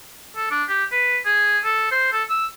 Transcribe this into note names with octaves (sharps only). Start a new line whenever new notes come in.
A4
D4
G4
B4
G#4
A4
C5
A4
E6